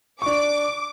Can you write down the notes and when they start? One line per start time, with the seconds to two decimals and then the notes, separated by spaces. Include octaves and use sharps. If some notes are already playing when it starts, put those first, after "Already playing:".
0.22 D4 C#6 D6